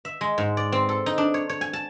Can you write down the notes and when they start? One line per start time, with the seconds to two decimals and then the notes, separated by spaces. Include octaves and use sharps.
0.05 E5
0.21 G#3
0.38 G#2
0.57 D5
0.72 C4
0.89 A4
1.06 D#4
1.18 D4
1.34 C#5
1.49 C#5
1.61 G#5
1.73 A5